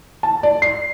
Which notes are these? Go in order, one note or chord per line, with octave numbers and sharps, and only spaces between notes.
A5
D5
C7